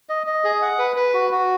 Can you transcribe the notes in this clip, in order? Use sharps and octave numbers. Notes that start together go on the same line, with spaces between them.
D#5
D#5
G#4
F#5
B4
B4
F#4
F#4